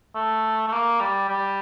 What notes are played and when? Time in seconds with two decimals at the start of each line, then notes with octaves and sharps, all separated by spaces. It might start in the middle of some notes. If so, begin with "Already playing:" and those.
0.15 A3
0.68 A3
0.72 A#3
1.00 G3
1.29 G3